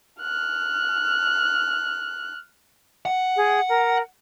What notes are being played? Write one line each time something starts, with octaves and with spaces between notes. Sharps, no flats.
F6 F#6
F#5
G#4
A#4